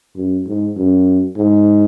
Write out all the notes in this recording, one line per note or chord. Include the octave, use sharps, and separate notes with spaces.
F#2
G#2
F#2
G#2